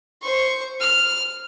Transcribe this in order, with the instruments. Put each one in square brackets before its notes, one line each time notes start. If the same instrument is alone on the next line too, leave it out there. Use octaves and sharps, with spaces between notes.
[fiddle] C5 C#6
F6